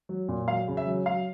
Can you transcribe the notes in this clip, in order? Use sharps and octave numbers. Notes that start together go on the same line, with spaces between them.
F#3
A#2
F#3 F5
C#3
E5
F#3
F#3 F5